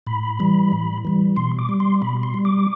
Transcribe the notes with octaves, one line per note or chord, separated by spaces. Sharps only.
A2 B5
E3 G3
A2
E3 G3
B2 C6
D6
G3
C6
B2 B5
C6
G3
D6